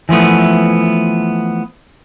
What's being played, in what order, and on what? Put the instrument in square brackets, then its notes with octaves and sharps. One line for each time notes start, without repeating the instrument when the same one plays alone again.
[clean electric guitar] E3 F3 A3 B3